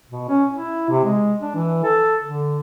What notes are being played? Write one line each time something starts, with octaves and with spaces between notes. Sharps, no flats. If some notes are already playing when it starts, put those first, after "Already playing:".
B2
C#4
E4
C3
G#3
D4
E3
A4
D3